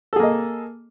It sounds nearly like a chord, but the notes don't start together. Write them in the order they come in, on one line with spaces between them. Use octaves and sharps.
A4 G#4 A#3 D#5